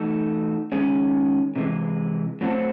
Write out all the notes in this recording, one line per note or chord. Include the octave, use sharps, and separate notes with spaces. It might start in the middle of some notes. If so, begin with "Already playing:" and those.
Already playing: E3 A3 D#4 F#4 A4
D#3 G#3 C#4 G#4
C3 E3 G#3
A2 F#3 C4 F#4 A4